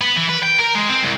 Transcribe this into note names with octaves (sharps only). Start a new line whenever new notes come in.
B3
E3
B4
G5
A#4
G#3
C4
C2